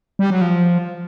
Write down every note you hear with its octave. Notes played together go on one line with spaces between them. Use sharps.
G3
F#3
F3